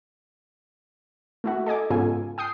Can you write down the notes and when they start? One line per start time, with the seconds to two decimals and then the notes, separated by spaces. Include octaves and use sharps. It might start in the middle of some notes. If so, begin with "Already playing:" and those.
1.44 A3 E4 F#4
1.66 A4 D#5 G#5 D6
1.90 G#2 C#3 B3 F4 A4 G#5
2.38 G5 D#6 G6 C7